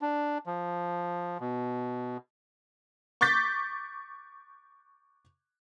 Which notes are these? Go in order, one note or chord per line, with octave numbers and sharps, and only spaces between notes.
D4
F3
B2
C#6 D6 G6 A6 B6